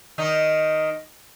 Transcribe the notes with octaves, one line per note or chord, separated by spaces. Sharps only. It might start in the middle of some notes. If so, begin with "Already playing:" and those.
D#3 D#4